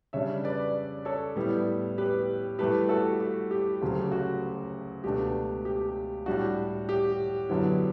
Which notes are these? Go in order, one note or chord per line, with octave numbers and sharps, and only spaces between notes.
C#3 G3 D4 C#5 E5
B4 D5
A4 C#5
A2 G3 B3 E4
G4 B4
G2 E3 A3 E4 G4 B4
F#4 A4
F#4
G4
D2 C#3 F#3 A3
F#4
C#2 B2 A3 D4 G4
G4
A2 G3 D4 F#4
G4
F#2 D3 F#3 B3 E4